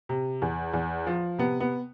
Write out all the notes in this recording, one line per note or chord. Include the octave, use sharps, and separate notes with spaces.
C3
E2
E2
F3
C3 B3
B3